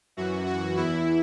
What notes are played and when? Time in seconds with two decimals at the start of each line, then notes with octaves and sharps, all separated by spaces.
0.17 F#2 E3 F#4
0.46 F#4
0.77 E2 E3 E4